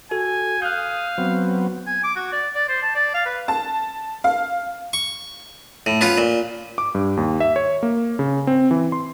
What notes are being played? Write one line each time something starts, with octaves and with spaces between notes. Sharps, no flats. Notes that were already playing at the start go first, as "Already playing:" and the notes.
F#4 A4 G#5
F5 D#6 F#6 G6
F#3 B3 C4
G#5
D6
F#4
D5
D5
C5
A5
D5
F5
B4
A5
F5
C#6
A2
B3 C#4 F4
A#2
D6
G2
D#2
E5
C#5
A#3
C#3
C4
E3
C6